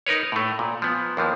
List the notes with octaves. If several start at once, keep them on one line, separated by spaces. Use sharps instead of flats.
D#4 A#4 B4 C#5
A2 A3
A#2
F3 B3
D#2 E3 F3